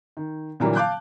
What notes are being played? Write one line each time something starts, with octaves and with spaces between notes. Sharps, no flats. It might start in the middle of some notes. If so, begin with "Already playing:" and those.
D#3
A#2 D3 E3 F#3 G3 A#3
F5 A5 D6 F#6 G6